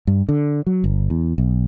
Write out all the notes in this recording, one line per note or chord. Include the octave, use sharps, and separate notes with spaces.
G2
D3
F#3
G1
E2
B1